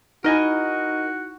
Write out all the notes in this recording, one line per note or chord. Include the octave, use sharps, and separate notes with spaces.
D#4 E4 F#4 A#4 D#5 G#5